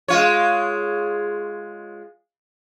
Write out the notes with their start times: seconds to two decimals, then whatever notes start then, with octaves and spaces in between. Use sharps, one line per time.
0.08 G#3 F4 C#5